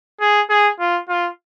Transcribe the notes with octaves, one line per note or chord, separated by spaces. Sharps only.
G#4
G#4
F4
F4